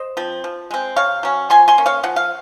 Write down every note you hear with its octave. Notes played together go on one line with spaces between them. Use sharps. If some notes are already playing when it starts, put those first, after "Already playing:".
Already playing: C5 D#5
F3 C4
F3
G#3 C4
C3 C#5 F5
F#3 C#4
F3 G#5 C6
G#5 C6
A#3 C#4
C#5 F5
F3 F#5
F5